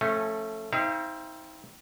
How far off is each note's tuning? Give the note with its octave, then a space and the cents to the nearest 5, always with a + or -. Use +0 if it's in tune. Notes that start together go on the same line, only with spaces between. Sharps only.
F3 +0 A3 +0 C#4 -25
C4 +0 D#4 +40 F5 -40